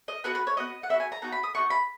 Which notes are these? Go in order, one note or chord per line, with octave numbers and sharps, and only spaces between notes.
D#5
B3 F#4 B4
B4
C#5
B3 F#4 D#5
F#5
B3 D#4 F#4 E5
G#5
A#5
B3 D#4 F#4 A#5
B5
D#6
B3 D#4 F#4 C#6
B5